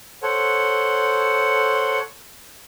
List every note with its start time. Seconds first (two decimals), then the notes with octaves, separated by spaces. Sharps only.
0.23 A4 C5 C#5 F#5